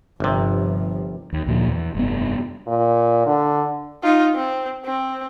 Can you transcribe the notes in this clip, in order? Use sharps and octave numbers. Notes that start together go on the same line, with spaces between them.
G1 G2 C3 F3
D#2
D2 A#2 F3
E2
F1 G2 B3
A#2
D3
D#4 F4
C4
C4